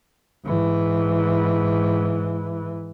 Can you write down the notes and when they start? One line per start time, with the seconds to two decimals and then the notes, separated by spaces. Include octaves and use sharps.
0.45 G#2 E3